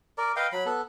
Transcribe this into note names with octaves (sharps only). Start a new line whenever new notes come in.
A#4 D5
B4 D#5 F5 G5
F#3 B5
B3 A4